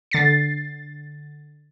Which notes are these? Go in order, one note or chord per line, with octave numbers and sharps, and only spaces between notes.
D3 A6 C7